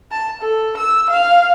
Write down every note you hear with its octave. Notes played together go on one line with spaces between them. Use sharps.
A5
A4
E6
F5